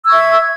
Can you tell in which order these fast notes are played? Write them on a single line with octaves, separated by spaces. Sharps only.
E6 G#6 C#6 E5